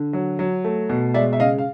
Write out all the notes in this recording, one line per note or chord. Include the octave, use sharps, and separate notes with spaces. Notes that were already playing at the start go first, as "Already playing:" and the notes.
Already playing: D3
F#3
F#3
A3
B2
G#3 D5 E5
E5
C#3 D#5 F5
F5